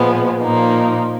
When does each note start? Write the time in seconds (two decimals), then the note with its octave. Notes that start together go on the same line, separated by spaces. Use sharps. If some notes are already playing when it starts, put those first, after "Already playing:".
Already playing: A#2 F3 G#3 B3
0.41 A#2 F3 A#3 D#4